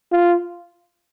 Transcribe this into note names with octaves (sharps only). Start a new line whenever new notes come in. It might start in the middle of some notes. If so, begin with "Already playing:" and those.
F4